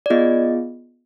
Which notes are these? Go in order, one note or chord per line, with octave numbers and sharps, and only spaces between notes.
D5
B3 F4 G#4 D#5